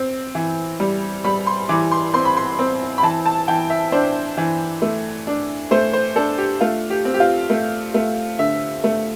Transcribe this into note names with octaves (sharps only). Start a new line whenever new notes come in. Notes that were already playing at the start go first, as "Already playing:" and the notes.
Already playing: C4
E3
G3
G3 B5
C6
E3 D6
C6
C4 C6
B5
C6
C4
B5
E3 A5
A5
E3 G5
E5
D4 C5
E3
A3
D4
A3 C5
C5
D4 A4
G4
A3 F4
G4
C4
G4
F4
A3
A3
D3 E5
A3